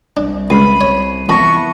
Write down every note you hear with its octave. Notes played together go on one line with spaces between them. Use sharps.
C2 D4
C#2 B5 C7 D#7
C#5
F2 E3 B3 A5 B5 C#6 A#6